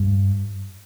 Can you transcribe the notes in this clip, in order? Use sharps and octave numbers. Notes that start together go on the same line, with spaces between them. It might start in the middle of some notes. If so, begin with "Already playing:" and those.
Already playing: G2